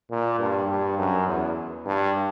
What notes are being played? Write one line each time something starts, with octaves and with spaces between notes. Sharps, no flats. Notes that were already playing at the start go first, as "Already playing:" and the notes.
A#2
G2
G2
F#2
E2
G2